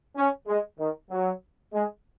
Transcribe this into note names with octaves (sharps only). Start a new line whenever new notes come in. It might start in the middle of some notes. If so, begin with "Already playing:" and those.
C#4
G#3
D#3
F#3
G#3